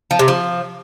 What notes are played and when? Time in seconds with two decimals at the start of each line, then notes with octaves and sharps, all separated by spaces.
0.11 F3
0.19 C3
0.28 F3